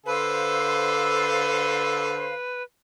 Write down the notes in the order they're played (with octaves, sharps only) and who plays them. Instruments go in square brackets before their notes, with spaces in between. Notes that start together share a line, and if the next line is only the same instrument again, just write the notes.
[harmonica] D3 A4 [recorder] B4 [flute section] C5 F5